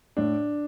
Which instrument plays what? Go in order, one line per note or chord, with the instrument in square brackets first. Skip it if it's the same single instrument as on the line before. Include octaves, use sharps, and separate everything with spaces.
[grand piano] A2 D4